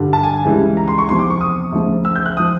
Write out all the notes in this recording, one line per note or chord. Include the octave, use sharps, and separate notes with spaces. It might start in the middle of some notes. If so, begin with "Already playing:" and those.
Already playing: G2 D3 G3
A5
G#5
C#2 C#3 E3 G3
A#5
C6
C#6
E2 C3 F3 C6
D6
C#6
D#6
D2 C#3 F3
E6
G6
F#6
F3 D#6